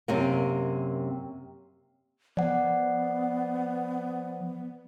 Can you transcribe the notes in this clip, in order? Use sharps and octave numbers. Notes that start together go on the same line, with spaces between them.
F#2 C3 A#3
F3 B3 D5 F#5